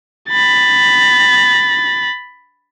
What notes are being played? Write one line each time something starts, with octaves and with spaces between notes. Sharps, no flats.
B5 A6